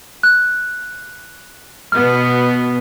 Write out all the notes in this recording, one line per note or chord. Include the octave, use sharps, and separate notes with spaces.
F#6
B2 B3 F6